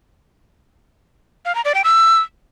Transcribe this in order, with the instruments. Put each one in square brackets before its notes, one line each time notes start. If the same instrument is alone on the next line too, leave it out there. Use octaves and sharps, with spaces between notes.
[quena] F5
A#5
D5
G5
E6